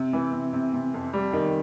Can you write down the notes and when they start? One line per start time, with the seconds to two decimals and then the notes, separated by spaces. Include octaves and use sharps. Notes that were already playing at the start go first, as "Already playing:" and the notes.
Already playing: C3
0.13 E3
0.33 C3
0.53 C3
0.73 C3
0.94 F2
1.13 G3
1.33 D#3